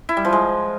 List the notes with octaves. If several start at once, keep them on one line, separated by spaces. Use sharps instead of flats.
E4
G3
F3
G#3